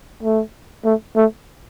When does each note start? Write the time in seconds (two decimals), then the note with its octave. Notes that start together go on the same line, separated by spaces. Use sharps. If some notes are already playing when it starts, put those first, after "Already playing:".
0.23 A3
0.85 A3
1.16 A3